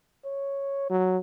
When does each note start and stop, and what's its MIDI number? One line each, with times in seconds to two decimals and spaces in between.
0.25 0.87 73
0.90 1.18 54